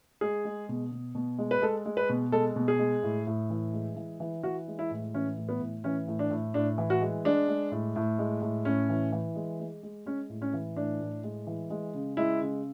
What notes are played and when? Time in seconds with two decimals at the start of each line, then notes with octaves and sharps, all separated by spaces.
0.21 G#3 G#4
0.45 G#3
0.69 B2
0.92 B2
1.15 B2
1.38 G#3
1.51 B4
1.62 G#3 A4
1.85 G#3
1.97 B4
2.09 B2
2.32 G#3 A4
2.56 B2
2.68 G#4
2.79 G#3
3.03 A2
3.27 A2
3.50 E3
3.73 G#3
3.96 E3
4.20 E3
4.43 E3 F#4
4.68 G#3
4.79 E4
4.91 A2
5.14 E3 C#4
5.37 A2
5.49 B3
5.61 A2
5.84 E3 C#4
6.08 A2
6.19 D4
6.31 A2
6.54 A2 D4
6.78 E3
6.90 F#4
7.01 G#3
7.25 G#3 D4
7.48 G#3
7.72 A2
7.96 A2
8.19 G#3
8.42 A2
8.65 A2 C#4
8.89 E3
9.12 E3
9.35 G#3
9.60 G#3
9.83 G#3
10.06 G#3 C#4
10.29 A2
10.42 C#4
10.54 E3
10.76 A2 D4
11.01 A2
11.23 G#3
11.47 E3
11.70 G#3
11.94 C#3
12.17 G#3 E4
12.41 C#3